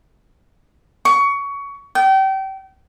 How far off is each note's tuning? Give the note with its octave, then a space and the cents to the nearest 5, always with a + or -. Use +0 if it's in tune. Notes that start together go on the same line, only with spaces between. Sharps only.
C#6 +20
G5 -30